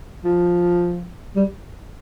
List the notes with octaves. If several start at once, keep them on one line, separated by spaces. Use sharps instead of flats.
F3
G3